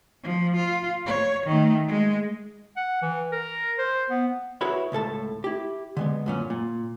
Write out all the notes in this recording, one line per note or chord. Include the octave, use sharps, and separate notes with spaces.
F3
F4
C#5
D#3 A3
G#3
F#5
E3
A#4
C5
B3
E4 F#4 G#4 B4 C#5 E5
C#2 A2 A4 A5
E4 G4
D3 G#3 B3
F#2 A#2 C#4
A#2